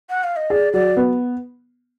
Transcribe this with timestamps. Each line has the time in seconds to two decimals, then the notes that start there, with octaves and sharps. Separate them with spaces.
0.10 F#5
0.24 F5
0.36 D#5
0.50 G#4 D5
0.73 F#3 D5
0.97 B3